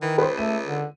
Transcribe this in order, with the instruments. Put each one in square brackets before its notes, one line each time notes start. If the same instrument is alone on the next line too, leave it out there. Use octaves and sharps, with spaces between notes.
[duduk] D#3 [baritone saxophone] E3
[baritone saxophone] C#2 [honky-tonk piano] B4 C5
[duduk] A3 [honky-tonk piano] D#7
[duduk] D3